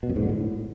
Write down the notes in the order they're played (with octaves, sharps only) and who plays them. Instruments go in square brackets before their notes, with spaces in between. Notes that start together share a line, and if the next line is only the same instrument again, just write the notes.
[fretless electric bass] B2
F#2
G#2
D3
A2